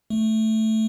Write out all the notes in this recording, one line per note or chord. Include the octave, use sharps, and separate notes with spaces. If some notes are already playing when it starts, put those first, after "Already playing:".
A3